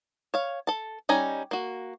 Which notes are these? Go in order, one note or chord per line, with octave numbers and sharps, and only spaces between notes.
C#5 F5
A4 A5
G3 C#4 D#4 G#5 A#5
A#3 F#4